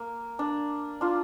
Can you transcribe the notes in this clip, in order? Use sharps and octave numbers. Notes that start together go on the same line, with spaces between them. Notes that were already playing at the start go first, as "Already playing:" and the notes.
Already playing: A#3
D4
D4 F4